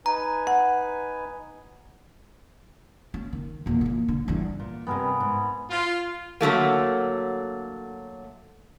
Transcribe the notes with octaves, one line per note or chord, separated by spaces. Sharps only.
D#4 B4 G#5 A#5
F#5
C#4
D#3
E2 A#2
A#2 E3
D3
E2 G2
A#2
G2 C3 B3 G#4 A#4
G#2
F4
D3 F#3 A3 A#3